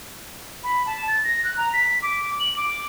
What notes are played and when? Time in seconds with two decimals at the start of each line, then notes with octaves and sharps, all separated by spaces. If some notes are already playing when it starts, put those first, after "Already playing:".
0.64 B5
0.86 A5
1.07 A6
1.24 A#6
1.44 F#6
1.57 A#5
1.73 B6
2.02 D6
2.40 F#7
2.57 D6